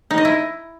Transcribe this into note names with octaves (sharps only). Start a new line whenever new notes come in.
D#4
D#5
E4